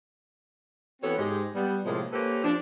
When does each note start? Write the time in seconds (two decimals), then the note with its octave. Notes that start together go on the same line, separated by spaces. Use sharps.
1.02 E3 B3 C4 F#4 A4 C#5
1.17 G#2 G#3 G4
1.55 G3 B3
1.85 A2 C3 F3 G#3 A#3
2.12 A#3 C#4 G4 A4 B4 C5
2.43 F3 D4